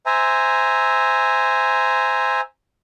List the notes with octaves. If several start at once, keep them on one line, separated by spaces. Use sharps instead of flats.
C5 E5 G#5 A#5